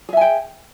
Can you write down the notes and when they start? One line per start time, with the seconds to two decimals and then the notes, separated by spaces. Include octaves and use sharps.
0.09 G#4
0.13 E5
0.17 G#5
0.21 G5